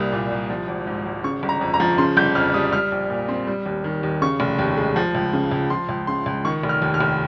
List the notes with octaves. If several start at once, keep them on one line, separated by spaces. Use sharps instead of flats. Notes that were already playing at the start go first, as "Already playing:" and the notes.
Already playing: C2 G3 A#3 D#6
A#2
C2
F3
G#1
G#2
G#1
C#3 C#6
G1
A#5
F2
A#5
F3
C#3 C6
G1 G6
F2 F6
G3 D#6
G3 F6
A#1
A#2
C4
G3
D#2
D#3
D#2
C#3 C#6
F1
D#2
G#3
F3
C#2
C#3
C#2
F3 C6
C#2
C#3 C6
C#2
D#3 C#6
F1
F6
D#2
F6
F1